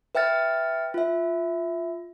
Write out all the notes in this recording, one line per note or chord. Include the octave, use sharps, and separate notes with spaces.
B4 E5 G5 F6 A6
F4 E5